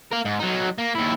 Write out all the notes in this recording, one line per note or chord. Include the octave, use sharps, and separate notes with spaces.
A#4 F5
G#2
F#3 D#4
A#3
D#2 E4